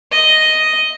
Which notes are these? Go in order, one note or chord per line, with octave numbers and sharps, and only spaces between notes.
D#5